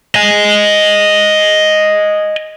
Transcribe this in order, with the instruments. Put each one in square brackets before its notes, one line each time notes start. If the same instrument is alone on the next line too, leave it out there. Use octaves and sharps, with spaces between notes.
[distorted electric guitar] D#5 G#5